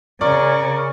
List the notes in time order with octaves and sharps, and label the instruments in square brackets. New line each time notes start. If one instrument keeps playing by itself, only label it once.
[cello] C#3 [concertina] A#4 C#6 [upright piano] D5